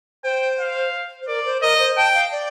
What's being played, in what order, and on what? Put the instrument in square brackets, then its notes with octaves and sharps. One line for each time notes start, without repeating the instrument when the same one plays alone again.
[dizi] C5 [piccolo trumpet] G5
[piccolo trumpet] F5
[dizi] C5
[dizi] A#4 [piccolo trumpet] D5
[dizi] C5
[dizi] A#4 [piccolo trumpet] D#5
[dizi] C5
[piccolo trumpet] G5 [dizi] A5
[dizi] F5
D5